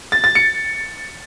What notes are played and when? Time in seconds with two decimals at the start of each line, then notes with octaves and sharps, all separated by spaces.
0.12 A6
0.24 A6
0.35 C#7